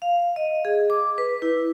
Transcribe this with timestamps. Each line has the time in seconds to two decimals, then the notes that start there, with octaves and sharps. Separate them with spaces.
0.02 F5
0.36 D#5
0.65 G#4
0.90 D6
1.18 B4
1.42 E4